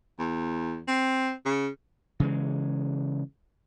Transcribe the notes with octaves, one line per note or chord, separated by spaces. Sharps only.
E2
C4
C#3
C#3 E3 G#3